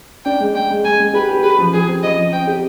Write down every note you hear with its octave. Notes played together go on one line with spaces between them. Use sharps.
D4 G5
G#3
G#3 G5
G#3
G#3 G#5
G#3
G4 B4
G4
G4 B4
F3
G4 G#4
C4
F3 D#5
C4
C4 G5
G4